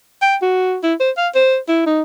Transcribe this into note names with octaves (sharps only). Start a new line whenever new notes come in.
G5
F#4
E4
C5
F5
C5
E4
D#4